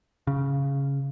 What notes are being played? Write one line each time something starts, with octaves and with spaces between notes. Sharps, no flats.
C#3